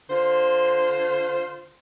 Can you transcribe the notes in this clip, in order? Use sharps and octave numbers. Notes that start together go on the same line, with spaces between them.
D3 F4 C5